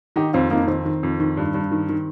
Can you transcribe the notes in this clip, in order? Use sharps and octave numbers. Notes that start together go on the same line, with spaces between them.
D#3 D#4 G4
F2 C4 F4
F2 A#3 D#4
D#4
D#3 C4
D#3
F2
D#3
G2
G2
D#3
D#3